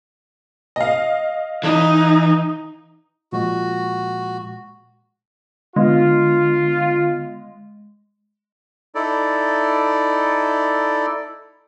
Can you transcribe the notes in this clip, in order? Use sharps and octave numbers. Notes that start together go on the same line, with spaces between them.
D#5 F5
E3 D#4
A#2 F3 G#3 F#4
D3 G#3 B3 F4
D#4 E4 A4 D5